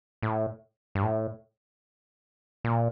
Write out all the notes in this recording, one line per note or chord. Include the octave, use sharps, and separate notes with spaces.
A2
G2
A2
A#2